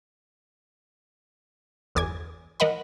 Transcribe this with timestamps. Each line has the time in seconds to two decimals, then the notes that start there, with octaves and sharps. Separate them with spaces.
1.95 G1 E2 G#5 D6 G#6
2.60 E3 A#4 D#5 F#5 B5